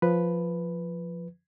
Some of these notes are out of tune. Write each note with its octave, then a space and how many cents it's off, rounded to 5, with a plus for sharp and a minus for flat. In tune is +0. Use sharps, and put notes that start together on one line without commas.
F3 +0 B4 +0